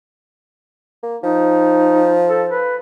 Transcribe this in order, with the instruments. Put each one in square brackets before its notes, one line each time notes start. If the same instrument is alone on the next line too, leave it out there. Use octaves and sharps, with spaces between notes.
[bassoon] A#3
[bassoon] F3 [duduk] D#4
[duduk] A4
B4